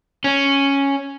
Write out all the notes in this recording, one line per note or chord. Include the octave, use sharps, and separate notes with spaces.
C#4